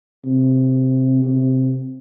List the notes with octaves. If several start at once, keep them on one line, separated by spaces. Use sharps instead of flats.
C3
C3